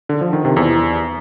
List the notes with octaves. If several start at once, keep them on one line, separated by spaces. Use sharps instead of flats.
D3
F3
D#3
C3
E2